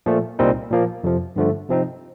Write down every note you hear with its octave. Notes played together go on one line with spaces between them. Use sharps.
A#2 F3 A3
C2 A#2 G3 C4 D#4
A#2 F3 A#3
F2 C3 F3
G2 D3 F3 A3
C3 F3 C4 D#4